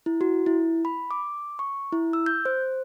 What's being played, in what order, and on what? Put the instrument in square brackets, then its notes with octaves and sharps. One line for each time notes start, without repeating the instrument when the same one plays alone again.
[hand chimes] E4
F#4
E4
B5
D6
C#6
E4
E6
G6
C5